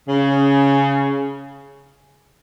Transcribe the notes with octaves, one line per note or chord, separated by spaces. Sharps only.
C#3